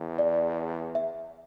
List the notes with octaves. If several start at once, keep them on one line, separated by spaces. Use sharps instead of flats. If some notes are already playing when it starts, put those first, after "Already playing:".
Already playing: E2
D5
E5